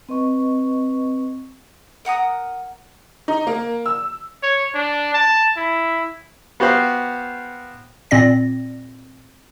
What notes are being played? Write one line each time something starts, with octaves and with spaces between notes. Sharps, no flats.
C4 B4 D#5 C#6
A#4 F#5 A#5 D#6
D#4
A#3
E6
C#5
D4
A5
E4
B3 F#4 G4 C5 F5
A#2 C4 D5 A#6